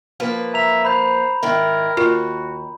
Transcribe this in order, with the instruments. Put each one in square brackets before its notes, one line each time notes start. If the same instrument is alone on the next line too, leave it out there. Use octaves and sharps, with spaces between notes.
[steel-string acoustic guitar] F3 A#3 B4
[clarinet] E5 [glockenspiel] A#5 F7
[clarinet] C5 [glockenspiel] B5 G6
[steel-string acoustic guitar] G#2 D#3 E4 [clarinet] A#4
[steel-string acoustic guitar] D#2 [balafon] F4 A#4 [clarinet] F#4